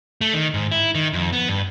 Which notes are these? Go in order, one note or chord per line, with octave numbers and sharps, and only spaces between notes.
A3
D#3
G#2
E4
D#3
F2
B3
G2